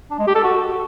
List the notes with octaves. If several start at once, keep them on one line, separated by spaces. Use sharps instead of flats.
D4
G#3
G4
A4
F#4